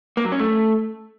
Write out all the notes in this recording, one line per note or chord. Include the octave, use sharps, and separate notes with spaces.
A#3
F#3
C#4
A3